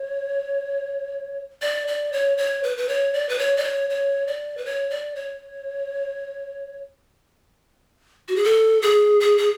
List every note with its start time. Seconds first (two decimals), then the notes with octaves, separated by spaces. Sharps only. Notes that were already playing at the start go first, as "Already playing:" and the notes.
Already playing: C#5
1.62 D5
1.88 D5
2.13 C#5
2.38 C#5
2.64 B4
2.77 B4
2.89 C#5
3.14 D5
3.29 B4
3.39 C#5
3.57 D5
3.64 C#5
3.90 C#5
4.28 D5
4.57 B4
4.66 C#5
4.91 D5
5.16 C#5
8.28 F#4
8.36 G#4
8.44 A4
8.82 G#4
9.20 G#4
9.38 G#4